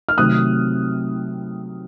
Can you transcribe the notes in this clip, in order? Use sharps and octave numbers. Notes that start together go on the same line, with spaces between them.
F6
C3 D#3 F#3 A3 C4 D#6 F#6